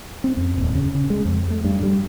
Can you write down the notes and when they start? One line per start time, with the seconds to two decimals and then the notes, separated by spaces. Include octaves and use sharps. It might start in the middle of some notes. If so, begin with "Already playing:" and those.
0.24 C4
0.37 F2
0.58 D#1
0.75 C#3
0.95 C#3
1.10 G#3
1.25 F2
1.50 A3
1.65 G2
1.83 G3